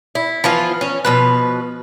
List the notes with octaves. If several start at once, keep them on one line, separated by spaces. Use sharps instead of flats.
E4
E3 F3 B3 F4
C#4
B2 F3 B4